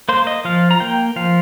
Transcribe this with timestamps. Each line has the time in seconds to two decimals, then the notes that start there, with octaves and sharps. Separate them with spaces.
0.09 A#3 C5
0.27 D#5
0.45 F3 F5
0.71 A#5
0.80 A#3 G5
1.16 F3 F5